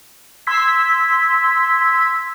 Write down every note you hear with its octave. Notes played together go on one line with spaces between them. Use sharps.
C6 E6 G#6 B6